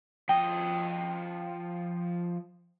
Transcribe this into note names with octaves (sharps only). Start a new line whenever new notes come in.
F3 D#5 G5